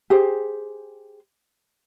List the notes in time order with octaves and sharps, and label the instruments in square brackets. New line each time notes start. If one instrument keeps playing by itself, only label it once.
[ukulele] G4 G#4 C5